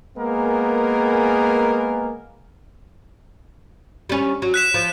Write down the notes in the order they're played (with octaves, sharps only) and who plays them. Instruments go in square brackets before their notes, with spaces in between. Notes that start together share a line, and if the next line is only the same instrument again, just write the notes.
[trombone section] G#3 A#3 B3 G#4 A#4
[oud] G3 C#4
F#3
[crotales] F#6 B6 E7
[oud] F3